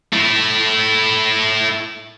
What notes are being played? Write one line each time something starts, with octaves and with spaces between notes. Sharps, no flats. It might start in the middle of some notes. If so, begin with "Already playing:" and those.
A3 E4